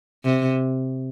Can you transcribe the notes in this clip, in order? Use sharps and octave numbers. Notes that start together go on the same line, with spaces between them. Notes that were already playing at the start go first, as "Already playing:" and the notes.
C3